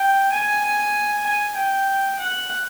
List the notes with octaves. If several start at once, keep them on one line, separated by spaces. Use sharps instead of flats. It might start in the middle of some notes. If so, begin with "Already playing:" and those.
Already playing: G5
G#5
G#5
G5
F#5